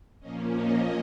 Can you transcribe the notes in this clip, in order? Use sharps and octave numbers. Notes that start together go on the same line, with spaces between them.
A#2 F3 A#3 C#4 D#5
D#5